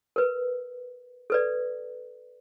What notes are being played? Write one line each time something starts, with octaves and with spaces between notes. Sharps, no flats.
A#4 B4
A4 B4 D5